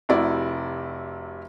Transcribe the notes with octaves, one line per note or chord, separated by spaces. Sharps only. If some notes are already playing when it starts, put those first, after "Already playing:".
F1 C3 E4 F#4 D5